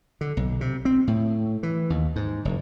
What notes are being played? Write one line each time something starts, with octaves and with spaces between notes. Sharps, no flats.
D3
B1
C3
C4
A2
E3
D#2
G#2
F#1